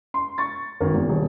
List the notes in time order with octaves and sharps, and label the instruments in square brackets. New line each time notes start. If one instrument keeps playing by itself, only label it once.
[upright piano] C6
C#6 A6
G#1 A#4
E2
D#1